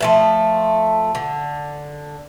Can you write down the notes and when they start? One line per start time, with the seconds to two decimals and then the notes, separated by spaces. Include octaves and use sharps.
0.01 F3 A3 E5
1.15 D3